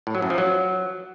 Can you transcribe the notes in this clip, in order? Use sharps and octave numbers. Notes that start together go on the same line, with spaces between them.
A2
F#3
F#2
F3
F#3